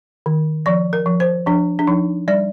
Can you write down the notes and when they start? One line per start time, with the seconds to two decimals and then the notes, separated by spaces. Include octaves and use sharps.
0.26 D#3
0.66 F3 D5
0.93 A#4
1.06 F3
1.20 C5
1.46 F3 D4
1.79 D4
1.87 F3 D#4
2.28 G3 D5